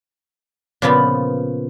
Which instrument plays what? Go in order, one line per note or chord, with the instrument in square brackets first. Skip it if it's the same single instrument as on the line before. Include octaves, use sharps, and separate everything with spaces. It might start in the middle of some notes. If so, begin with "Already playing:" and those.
[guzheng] A#2 C#3 F3 B3 B5